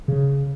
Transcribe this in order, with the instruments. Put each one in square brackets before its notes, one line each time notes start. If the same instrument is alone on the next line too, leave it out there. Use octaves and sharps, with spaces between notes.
[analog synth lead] C#3